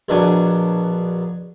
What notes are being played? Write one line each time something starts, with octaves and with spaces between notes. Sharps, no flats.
A#1 B2 F#3 D4 D5 G#5